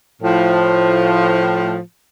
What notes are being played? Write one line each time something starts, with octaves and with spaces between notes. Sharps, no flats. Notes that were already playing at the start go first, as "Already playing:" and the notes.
A2 F3